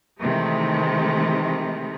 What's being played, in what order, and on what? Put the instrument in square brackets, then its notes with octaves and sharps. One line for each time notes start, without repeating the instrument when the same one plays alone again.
[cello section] C3 D#3 E3 G#3 A3